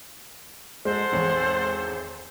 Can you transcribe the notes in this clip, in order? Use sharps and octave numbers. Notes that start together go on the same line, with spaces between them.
G#3 A4 C5 F#5
G#1 E2 C#5